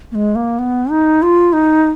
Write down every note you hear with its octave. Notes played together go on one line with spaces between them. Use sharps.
A#3
G#3
A#3
B3
D#4
F4
D#4